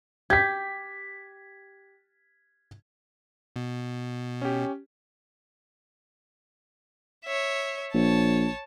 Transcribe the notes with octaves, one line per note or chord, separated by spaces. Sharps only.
G4 G#6 B6
B2
C#4 G4
C#5 E5
A#1 C#5 A5